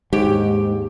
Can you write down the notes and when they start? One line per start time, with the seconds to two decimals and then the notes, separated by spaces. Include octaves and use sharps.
0.13 D#2 G#2 G4